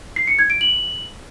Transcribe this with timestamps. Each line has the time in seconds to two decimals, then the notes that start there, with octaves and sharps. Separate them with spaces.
0.16 C7
0.27 C#7
0.39 G#6
0.50 D7
0.61 F#7